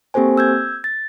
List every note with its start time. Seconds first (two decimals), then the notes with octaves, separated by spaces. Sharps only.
0.14 A#3 C4 G4 A4 C5 G#5
0.37 E6 G6 G#6
0.84 A6